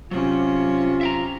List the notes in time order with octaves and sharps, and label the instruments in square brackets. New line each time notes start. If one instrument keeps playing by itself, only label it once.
[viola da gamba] C3 C#4 [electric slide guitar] F#3 [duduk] F4
[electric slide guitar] E5 G5 A#5